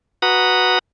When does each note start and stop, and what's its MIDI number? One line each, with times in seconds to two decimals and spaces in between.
0.22 0.79 66
0.22 0.79 71
0.22 0.79 78
0.22 0.79 82
0.22 0.79 87